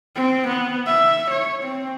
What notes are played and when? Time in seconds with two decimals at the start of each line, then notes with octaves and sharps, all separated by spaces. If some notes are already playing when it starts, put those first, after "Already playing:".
0.16 C4
0.48 B3
0.87 E5
1.31 C#5
1.64 C4